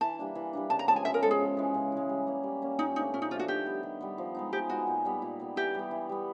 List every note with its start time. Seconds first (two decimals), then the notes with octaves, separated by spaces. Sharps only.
0.01 E3 A5
0.19 G3 A#3 D4
0.35 E3
0.53 G3 A#3 D4
0.70 C#3 A5
0.79 A#5
0.87 F3 G#3 B3 A5
0.96 G#5
1.05 C#3 E5
1.14 A#4
1.23 F3 G#3 B3 A4
1.31 G#4
1.39 C#3
1.57 E3 G#3
1.74 C#3
1.92 E3 G#3
2.09 G3
2.27 A#3 C#4
2.43 G3
2.62 A#3 C#4
2.79 A#2 D#4
2.96 F3 A3 D4 D#4
3.14 A#2 C#4
3.22 D#4
3.31 F3 A3 D4 F4
3.39 F#4
3.48 D#3 G4
3.66 G3 B3
3.83 D#3
4.01 G3 B3
4.18 F3
4.35 G#3 B3 D#4
4.53 F3 G4
4.69 G#3 B3 D#4 F#4
4.87 A#2
5.05 G3 B3
5.22 A#2
5.40 G3 B3
5.56 E3 G4
5.74 G3 B3
5.91 E3
6.09 G3 B3